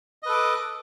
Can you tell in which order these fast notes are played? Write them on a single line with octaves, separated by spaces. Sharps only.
D#5 B4 A4 D6